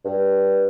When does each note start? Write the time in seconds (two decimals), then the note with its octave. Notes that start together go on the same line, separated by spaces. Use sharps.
0.04 G2